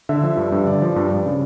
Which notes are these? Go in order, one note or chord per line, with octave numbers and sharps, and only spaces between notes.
D3 E5
F3
G2
G2
D3 D5
F3
G2
G2
C#3